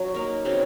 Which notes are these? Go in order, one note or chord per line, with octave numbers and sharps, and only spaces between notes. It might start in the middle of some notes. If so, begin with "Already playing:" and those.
Already playing: F#3 C#4
A#3 D#4 A#4
C#3 F#3 C4 D#4